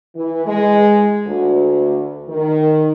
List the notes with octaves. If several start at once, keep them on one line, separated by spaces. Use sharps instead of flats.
E3
G#3
D2
D#3